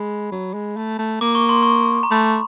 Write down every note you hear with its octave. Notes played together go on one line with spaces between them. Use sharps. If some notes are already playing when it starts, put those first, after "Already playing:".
Already playing: G#3 B5
F#3
G#3
A3
A3
A#3 D6
C#6
C6
C#6
A#5
A3 B5